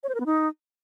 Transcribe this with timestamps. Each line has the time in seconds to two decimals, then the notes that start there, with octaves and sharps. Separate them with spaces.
0.03 C#5
0.09 C5
0.15 A#4
0.20 B3
0.26 D#4